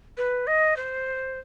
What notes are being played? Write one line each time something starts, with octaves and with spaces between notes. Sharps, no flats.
B4
D#5
C5